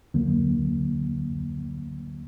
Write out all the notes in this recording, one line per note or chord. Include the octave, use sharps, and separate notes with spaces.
D2 D3 F#3 A#3